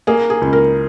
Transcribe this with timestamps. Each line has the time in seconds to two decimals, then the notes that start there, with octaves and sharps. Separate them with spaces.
0.07 A#3 G#4
0.30 G#4
0.42 C#2
0.53 A#4